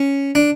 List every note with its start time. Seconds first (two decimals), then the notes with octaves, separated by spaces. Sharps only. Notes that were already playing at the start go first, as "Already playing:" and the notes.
Already playing: C#4
0.35 D4